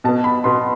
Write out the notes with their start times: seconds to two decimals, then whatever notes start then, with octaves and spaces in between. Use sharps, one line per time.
0.04 B2 B3 A5
0.24 B5
0.44 B2 B3 C6